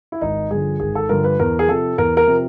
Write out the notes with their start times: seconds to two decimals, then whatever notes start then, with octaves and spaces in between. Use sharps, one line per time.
0.12 E4
0.21 G#1 D#4
0.51 G2 D3 F3 G#4
0.80 G#1 G#4
0.95 A4
1.09 G2 D3 F3 A#4
1.24 B4
1.39 E2 A#4
1.59 G#4
1.68 C3 F3 A4
1.98 E2 A#4
2.17 A#4
2.27 C3 F3